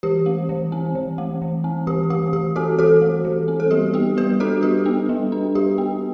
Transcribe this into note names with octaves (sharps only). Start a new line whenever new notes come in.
E3 G4
A3
E3
C4
E3
A3
E3
C4
E3 G4
A3 G4
E3 G4
C4 F#4 A4
E3 F#4 A4
A3
E3
C4
A4
G3 G4
B3 G4
G3 G4 B4
D4 F#4 A4
G3 G4
B3
G3
D4
G3 G4
B3